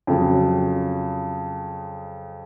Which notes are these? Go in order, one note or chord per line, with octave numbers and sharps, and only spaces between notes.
F2 C#3 F#3